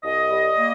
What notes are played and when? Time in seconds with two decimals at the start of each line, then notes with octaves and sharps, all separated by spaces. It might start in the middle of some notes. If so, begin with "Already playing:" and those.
0.03 C2 D#5
0.30 G3
0.58 A#3